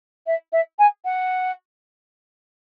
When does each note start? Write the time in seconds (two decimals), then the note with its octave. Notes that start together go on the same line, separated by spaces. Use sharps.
0.27 E5
0.53 E5
0.79 G#5
1.05 F#5